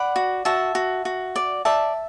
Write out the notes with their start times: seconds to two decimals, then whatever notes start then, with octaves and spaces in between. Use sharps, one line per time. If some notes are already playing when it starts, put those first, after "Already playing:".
Already playing: D5 F#5 B5
0.16 F#4
0.45 F#4 E5 A5
0.75 F#4
1.05 F#4
1.36 D5
1.65 D5 E5 A5